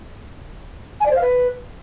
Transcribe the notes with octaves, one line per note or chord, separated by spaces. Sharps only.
G#5
D5
C5
F5
B4